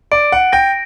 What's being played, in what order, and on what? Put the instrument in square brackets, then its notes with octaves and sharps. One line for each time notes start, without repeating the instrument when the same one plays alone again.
[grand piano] D5 [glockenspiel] D7
[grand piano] F#5
[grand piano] G5 [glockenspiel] A#6